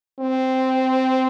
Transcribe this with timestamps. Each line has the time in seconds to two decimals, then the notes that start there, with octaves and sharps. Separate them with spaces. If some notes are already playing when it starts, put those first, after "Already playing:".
0.19 C4